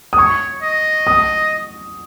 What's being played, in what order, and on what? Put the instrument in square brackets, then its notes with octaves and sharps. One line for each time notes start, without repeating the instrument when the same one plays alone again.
[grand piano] D#6
[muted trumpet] C#5 [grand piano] C#6
[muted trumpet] D#5
[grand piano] D#6